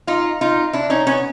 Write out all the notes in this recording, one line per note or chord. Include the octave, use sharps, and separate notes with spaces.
D#4 F4
D#4 F4
D4 E4
C#4 D#4
B3 C#4